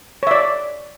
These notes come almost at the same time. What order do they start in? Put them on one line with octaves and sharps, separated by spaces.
C#5 E5 D5